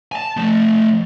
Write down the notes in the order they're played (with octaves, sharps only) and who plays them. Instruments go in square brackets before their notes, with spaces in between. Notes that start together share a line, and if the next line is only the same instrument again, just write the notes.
[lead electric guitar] G#5 A5
F3 A3